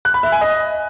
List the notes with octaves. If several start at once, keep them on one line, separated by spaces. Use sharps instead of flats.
F#6
B5
E5
G#5
D#5